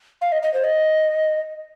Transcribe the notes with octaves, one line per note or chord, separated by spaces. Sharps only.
F5
D#5
D#5
C5
D#5